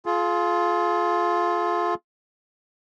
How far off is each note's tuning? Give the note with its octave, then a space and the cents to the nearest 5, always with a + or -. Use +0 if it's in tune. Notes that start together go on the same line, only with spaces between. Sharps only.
F4 +0 G#4 +40